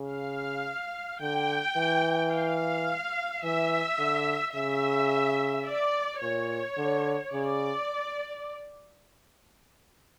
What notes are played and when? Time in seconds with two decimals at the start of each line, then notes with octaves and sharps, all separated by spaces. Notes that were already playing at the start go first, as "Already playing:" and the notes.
Already playing: C#3
0.10 F5
1.21 D3 G5
1.77 E3
2.32 F5
3.44 E3 E5
3.99 D3
4.55 C#3 E5
5.66 D5
6.22 A#2 C#5
6.78 D3
7.32 C#3 D5